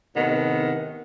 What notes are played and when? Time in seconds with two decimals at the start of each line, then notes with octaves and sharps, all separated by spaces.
0.15 A2 C3 D#3 B3